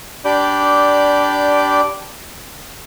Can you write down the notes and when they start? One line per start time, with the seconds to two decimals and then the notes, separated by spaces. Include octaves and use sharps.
0.25 D4 G4 D5 B5 D6 G6